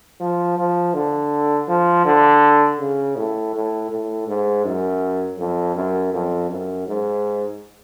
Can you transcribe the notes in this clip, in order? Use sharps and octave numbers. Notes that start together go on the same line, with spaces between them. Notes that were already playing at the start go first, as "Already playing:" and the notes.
F3
F3
D3
F3
D3
C#3
A2
A2
A2
G#2
F#2
F2
F#2
F2
F#2
G#2